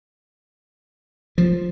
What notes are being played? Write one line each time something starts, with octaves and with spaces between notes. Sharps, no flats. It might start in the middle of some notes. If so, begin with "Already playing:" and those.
F3